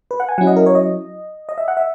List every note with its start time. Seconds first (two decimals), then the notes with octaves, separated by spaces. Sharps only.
0.11 B4
0.20 F#5
0.29 G#5
0.38 F#3 C#4 E4 F#5
0.47 D#5
0.56 A#4
0.66 C#5
0.75 D#5
1.49 D#5
1.58 E5
1.68 F#5
1.77 E5